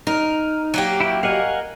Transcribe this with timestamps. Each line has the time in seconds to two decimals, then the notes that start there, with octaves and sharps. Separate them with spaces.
0.07 D#4 A#4
0.74 F#3 A#3 G4
1.00 E4 G5
1.23 A#4 D#5 F5 F#5 G#5